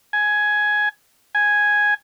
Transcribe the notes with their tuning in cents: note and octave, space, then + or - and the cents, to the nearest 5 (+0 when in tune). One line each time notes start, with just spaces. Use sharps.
G#5 +10
G#5 +0